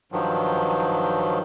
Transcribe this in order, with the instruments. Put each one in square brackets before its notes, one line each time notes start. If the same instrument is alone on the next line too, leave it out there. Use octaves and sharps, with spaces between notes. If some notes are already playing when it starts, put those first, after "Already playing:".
[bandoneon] G2 D#3 F3 F#3